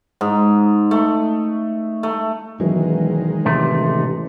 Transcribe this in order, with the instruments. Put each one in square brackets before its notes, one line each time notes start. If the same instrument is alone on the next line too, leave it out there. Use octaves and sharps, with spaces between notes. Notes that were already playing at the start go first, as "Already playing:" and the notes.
[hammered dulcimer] G#2
A3
A3
[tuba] E1 [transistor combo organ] D#3 G#3 [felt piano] E3 F#3
[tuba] A1 [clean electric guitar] C3 A3